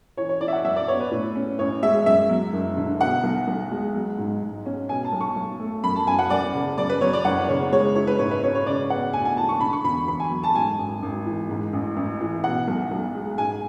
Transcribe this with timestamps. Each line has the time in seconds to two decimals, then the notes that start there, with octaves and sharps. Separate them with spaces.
0.17 E3 C#5
0.29 C#5
0.41 E4 D5
0.48 E5
0.53 F#5
0.65 F#2 E5
0.76 D5
0.88 B3 C#5
1.00 B4
1.11 A2
1.35 C#4
1.59 A1 C#5
1.83 G#3 E5
2.06 F#2 E5
2.29 F#3
2.53 F#1
2.77 D3
3.00 B2 F#5
3.24 B1
3.48 B1
3.71 G#3
3.95 F#3
4.18 G#2
4.42 G#2
4.66 C#4
4.89 B2 G#5
5.05 A5
5.13 B1
5.21 C#6
5.36 B1
5.60 A3
5.84 F#2 B5
5.95 A5
6.07 F#1 G#5
6.19 F#5
6.30 F#1 D5
6.54 C#3
6.78 F#2 D5
6.90 B4
7.01 F#3 C#5
7.13 D5
7.25 F#1 F#5
7.48 C#3 C#5
7.72 G#3 C#5
7.95 E4 C#5
8.07 B4
8.19 G#2 C#5
8.31 B4
8.43 C#4 C#5
8.55 C#5
8.66 C#3 D5
8.90 B3 F#5
9.13 D2 G#5
9.25 G#5
9.37 E3 A5
9.49 C#6
9.60 D3 B5
9.73 C#6
9.84 E2 B5
10.08 E2 B5
10.20 G#5
10.31 F#3
10.43 A5
10.55 G#2 G#5
10.79 G#1
11.03 G#1
11.26 E3
11.50 G#2
11.73 A1
11.97 A1
12.21 E3
12.44 B2 F#5
12.68 B1
12.91 B1
13.15 G#3
13.38 G#2 G#5